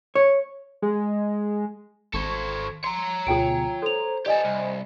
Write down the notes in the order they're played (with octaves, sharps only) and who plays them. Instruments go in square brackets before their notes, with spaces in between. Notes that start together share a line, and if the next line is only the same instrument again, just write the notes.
[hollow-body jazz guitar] C#5
[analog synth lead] G#3
[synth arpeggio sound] G#1 C#6 G#6 [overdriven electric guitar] A4 C5
[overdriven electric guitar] C#5 A#5 [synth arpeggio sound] C6
[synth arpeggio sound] D2 B2 G#4 [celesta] F4 G5 D7
[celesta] A4 F7 [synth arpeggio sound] C5
[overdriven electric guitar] G4 A4 [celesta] D5 D#5 G#5
[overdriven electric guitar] C2